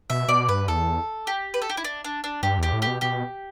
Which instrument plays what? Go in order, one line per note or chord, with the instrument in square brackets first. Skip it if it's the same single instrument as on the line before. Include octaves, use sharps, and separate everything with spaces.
[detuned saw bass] B2 [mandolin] E5
[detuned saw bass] B2 [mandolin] D5
[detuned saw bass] G2 [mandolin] B4
[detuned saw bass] E2 [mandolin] A4
[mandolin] G4
B4
A4
G4
E4
D4
D4
D4
[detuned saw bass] G2 [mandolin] G4
[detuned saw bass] E2 [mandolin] G4
[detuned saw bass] A2
[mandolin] G4
[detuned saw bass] B2
[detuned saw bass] B2 [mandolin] G4